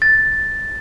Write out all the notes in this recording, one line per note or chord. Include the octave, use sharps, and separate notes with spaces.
A6